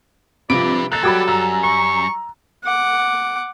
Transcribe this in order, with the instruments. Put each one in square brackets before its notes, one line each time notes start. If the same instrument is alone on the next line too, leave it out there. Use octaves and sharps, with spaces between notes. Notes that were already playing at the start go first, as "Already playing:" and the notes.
[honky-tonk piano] C3 F3 [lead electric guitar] D4 B4 [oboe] D5 [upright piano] D7
[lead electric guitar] D#2 A#3 [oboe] A4 [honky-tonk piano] F#6 A6
[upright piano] F#3 G3 F#4 [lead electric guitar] A#3 G5 [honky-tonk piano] B5 D6 G#6
[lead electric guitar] F#2 [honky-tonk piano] A#5 E6
[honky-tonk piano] A#5 [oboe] C#6
[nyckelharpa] F#5 D6